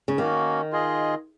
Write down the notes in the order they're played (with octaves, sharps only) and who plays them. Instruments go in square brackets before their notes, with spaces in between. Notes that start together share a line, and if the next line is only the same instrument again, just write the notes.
[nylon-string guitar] C#3
[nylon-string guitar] D#3 [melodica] A#3 C#4 F#4
[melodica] F4 G#4 D#5